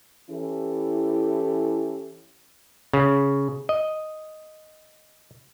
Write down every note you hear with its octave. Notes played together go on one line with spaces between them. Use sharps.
E3 C#4 E4 G4 A4
C#3
D#5